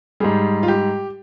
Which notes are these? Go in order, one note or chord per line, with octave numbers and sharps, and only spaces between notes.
G#2 G3 G#4
F4
G4